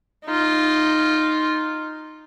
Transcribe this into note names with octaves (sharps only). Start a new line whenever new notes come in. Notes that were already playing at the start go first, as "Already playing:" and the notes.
D#4 F4